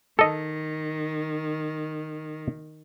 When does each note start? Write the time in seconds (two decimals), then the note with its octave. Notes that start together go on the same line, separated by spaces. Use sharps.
0.19 D#3 A4 D#5